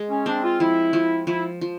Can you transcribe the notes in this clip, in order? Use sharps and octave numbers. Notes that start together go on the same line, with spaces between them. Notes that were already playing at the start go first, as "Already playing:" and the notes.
Already playing: G#3
C#4
C4 D4
F4
F3 E4
F3
F3 E4
F3